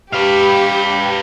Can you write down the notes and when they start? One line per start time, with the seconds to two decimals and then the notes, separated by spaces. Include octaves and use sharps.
0.13 G4 B4 F5